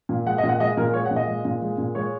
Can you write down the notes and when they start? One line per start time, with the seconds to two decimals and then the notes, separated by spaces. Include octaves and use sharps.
0.09 A#2
0.26 G#3 F#5
0.38 D#5
0.43 A#2
0.49 F#5
0.60 G#3 D#5
0.77 A#2 A#4
0.94 G#3 C#5
1.06 F#5
1.11 A#2
1.16 D#5
1.28 G#3
1.45 A#2
1.62 G#3
1.78 A#2
1.95 G#3 C#5